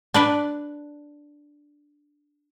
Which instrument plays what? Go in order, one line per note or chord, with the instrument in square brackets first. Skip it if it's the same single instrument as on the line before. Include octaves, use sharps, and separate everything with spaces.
[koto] D4 B4 D5